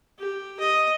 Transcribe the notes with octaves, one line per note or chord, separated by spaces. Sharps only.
G4
D#5